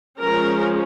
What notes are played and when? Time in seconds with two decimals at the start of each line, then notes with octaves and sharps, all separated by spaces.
0.20 F3 G#3 C#4 A#4